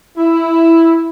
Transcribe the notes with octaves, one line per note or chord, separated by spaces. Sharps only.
E4